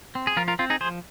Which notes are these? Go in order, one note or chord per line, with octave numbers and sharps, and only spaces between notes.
C4
G#4
F3 F4 A#4
F4 A#4
C4 F4
D#4 G#4
F3 G#4 C5